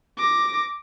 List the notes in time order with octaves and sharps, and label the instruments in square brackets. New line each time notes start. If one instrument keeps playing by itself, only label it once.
[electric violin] D6 A#6